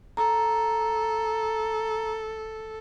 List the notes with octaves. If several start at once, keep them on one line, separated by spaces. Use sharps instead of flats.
A4 A#5